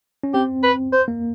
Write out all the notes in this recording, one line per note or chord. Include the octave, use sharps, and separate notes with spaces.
C#4
C4 G4
B4
C5
A#3